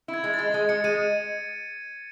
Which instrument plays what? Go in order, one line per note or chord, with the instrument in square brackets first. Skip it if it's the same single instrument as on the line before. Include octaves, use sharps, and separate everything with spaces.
[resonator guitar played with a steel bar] E4
[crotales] G#6
[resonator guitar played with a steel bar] G#3
[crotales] A6
[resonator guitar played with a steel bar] G#3
G#3
[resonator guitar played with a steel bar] G#3 [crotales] C#7
[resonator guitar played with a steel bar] G#3 [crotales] D#7